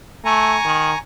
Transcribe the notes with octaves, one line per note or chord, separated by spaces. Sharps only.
A3 G#5 A#5 C#6
D#3